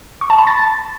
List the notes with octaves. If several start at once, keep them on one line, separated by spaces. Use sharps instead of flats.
C#6
A5
B5
A6